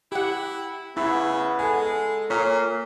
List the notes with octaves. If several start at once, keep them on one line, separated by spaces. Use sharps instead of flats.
E4 G4 F#5
C#3 B3 E4 B5 E6 B6
G#3 A4 G#5
A#2 A#3 C#5